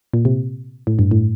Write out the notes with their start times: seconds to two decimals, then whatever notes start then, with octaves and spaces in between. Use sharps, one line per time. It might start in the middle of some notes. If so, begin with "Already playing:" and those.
0.14 A#2
0.25 C3
0.87 A2
0.99 G2
1.11 A2